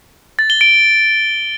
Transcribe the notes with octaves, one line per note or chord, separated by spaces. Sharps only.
A6
G7
D7